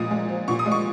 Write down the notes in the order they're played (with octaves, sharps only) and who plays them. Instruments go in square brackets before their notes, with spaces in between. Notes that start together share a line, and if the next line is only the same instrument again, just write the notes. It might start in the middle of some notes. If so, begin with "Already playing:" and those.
Already playing: [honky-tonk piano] A#2 G#3 D#6
G#3
F3
A#2 C#6
D#6
G#3
C#6